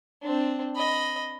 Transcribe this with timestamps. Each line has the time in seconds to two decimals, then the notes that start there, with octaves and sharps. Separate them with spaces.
0.22 C4 D4
0.76 D#5 B5